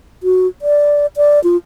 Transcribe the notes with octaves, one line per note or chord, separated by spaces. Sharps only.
F#4
D5
D5
F4